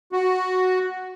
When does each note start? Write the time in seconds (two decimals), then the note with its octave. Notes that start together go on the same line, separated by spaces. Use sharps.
0.12 F#4